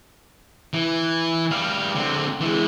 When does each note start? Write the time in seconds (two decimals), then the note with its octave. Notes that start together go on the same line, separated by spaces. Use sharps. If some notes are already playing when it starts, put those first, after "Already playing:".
0.73 E3
1.51 G3 F5
1.95 D3 C4
2.41 E3 G#3